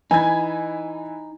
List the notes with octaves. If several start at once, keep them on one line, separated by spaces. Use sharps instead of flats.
E3 D#4 G#5 B5 G#6